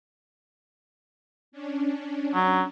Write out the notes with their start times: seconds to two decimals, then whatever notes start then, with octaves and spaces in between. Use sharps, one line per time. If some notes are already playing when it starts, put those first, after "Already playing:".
1.52 C#4 D4
2.35 F#3